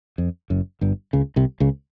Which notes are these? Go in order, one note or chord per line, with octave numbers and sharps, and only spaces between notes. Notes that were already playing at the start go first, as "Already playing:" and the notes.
F2
F#1 F#2
G1 G2
C#2 C#3
C2 C3
C#2 C#3